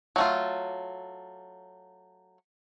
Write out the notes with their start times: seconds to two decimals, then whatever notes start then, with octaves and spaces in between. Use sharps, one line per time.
0.16 F#3 A3 F4